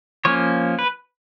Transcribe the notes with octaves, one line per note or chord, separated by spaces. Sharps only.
F3 A#3 C#4 C#5
B4